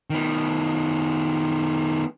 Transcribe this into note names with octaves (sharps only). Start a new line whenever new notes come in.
D#3 B3